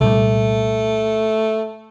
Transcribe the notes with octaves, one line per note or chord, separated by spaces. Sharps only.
C2 A#2 G3 A3